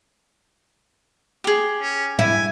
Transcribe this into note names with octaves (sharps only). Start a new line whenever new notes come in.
G4 G#4
C#4
E4 G#5